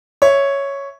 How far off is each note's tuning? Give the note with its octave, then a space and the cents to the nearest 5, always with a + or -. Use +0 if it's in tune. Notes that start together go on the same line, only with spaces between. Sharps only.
C#5 +0 E5 +0